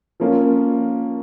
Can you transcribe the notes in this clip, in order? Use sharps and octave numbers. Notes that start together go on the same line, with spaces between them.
F3 A#3 C#4 F4